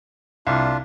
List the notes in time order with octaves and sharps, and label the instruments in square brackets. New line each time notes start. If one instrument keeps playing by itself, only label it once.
[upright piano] C2 [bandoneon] D4 F4